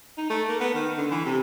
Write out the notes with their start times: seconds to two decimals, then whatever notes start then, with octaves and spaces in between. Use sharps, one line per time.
0.17 D#4
0.30 A3
0.48 A#3
0.60 B3
0.75 D#3
0.97 D3
1.11 E3
1.25 C3